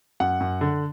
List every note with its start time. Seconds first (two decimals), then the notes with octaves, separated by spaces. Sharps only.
0.20 F#2 F#5
0.40 F#2
0.61 D3